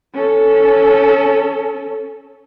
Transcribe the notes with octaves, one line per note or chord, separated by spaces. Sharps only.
C#4 A4